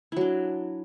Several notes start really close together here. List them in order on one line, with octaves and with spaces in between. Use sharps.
E4 F#3 D4